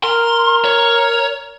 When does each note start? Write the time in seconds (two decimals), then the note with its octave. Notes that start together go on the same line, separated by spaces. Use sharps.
0.04 A#4 C6
0.64 C#5